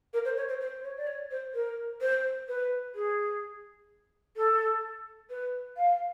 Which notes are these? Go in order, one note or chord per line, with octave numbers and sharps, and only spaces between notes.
A#4
C5
C#5
C5
C5
C#5
D5
C#5
C5
A#4
C5
B4
G#4
A4
B4
F5